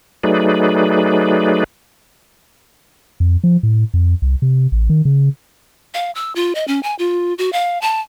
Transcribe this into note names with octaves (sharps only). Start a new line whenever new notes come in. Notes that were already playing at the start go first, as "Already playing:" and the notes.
F#3 A3 D#4 G#4 B4 D5
F2
F3
A2
F2
C2
C3
A1
D#3
C#3
F5
E6
F4
D#5
C#4
G#5
F4
F#4
F5
A5